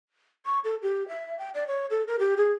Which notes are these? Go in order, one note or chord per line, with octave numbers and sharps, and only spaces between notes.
C#6
A4
G4
E5
G5
D5
C#5
A4
A#4
G4
G#4